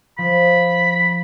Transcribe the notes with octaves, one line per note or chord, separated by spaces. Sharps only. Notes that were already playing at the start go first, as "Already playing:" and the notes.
F3 B5